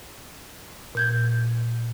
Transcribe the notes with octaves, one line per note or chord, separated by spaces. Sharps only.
A#2 G6 G#6